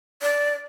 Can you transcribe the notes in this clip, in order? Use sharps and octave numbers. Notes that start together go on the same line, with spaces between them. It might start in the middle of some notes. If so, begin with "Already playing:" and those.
D5